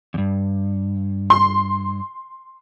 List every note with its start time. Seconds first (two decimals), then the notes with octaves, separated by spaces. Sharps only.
0.14 E2 G2
1.30 C6